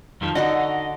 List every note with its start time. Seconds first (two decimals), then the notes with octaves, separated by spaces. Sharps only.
0.21 F2 D#3 F3
0.35 D3 D#4 F#4 A4 D#5